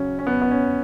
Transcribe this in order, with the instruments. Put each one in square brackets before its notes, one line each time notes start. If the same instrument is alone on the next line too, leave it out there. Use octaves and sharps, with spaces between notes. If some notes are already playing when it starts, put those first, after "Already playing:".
Already playing: [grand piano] C#3 F#3 C#4
C#4
B3
B3
C#4